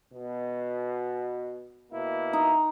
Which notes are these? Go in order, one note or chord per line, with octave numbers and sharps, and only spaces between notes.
B2
B2 A#3 E4
D#4